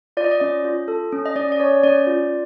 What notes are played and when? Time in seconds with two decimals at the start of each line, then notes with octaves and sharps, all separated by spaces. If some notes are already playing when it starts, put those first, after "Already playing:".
0.17 F4 D5
0.24 D#5
0.32 D5
0.40 C#4 D#5
0.65 F4
0.88 A4
1.12 C#4
1.26 D#5
1.36 C#4 D5
1.52 D5
1.60 C#4 C#5
1.83 C#4 D5
2.07 F4